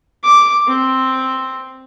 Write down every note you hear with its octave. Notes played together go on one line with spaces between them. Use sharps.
D6
C4